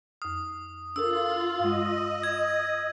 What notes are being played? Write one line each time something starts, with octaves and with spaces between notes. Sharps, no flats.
F2 D#6 F6
D4 F4 A4 A#4 E6
G2 G#3 D#5
G#6